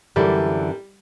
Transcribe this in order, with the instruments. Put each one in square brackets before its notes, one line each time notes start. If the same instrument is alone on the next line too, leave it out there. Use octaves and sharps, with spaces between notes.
[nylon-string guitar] F#2 D3 E3 [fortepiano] G3